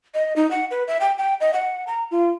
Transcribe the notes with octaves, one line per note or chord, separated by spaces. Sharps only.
D#5
D#4
F#5
B4
E5
G5
G5
D#5
F#5
A#5
F4